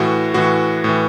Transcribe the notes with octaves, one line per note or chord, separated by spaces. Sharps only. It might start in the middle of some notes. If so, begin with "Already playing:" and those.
Already playing: A2 E3 F#4
A2 E3 F#4
A2 E3